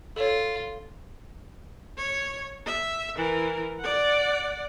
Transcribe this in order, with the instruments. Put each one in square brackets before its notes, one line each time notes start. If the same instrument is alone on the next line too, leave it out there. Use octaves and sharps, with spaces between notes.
[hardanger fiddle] F4 [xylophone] A4 C#5
[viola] C#5
E5
E3 A#4
D5 F#5